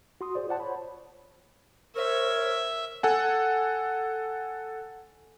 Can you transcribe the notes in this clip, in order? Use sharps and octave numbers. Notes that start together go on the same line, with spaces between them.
F#4 C6 D#6
G#4 C5 D5
F4 C5 D5 F#5 A5
C5 C#5 B5
A#4 C5 C#5 E5
A4 F#5 G#5